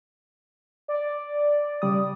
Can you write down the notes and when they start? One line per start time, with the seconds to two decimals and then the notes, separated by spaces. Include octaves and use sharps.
0.88 D5
1.82 C#3 G3 D#6